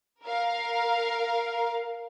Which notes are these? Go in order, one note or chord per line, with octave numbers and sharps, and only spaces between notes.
A#4 F5